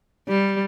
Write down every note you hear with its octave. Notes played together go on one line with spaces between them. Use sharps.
G3